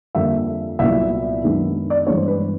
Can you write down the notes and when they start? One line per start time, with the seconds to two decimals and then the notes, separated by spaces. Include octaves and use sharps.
0.15 F2 D3 G3 A#3 E5
0.79 C2 A#2 F#3 B3 E5
1.42 F#2 D#3 G#3 B3 D4
1.90 D5
2.07 G2 E3 G#3 B3 D4 C#5
2.17 C5
2.28 B4